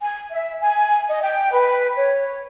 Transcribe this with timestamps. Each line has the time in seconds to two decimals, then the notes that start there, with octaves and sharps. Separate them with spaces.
0.01 G#5
0.31 E5
0.61 G#5
1.08 D#5
1.24 G5
1.52 B4
1.97 C#5